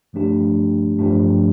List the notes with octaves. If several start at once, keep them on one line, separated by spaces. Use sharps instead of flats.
G2 F3 A3 D4 G4
G2 F3 A3 D4 G4